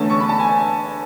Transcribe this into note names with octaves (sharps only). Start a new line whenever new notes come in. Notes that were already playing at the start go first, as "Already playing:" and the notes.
Already playing: E2 D3 A3 C#4 A5
C#6
B5
A5
G#5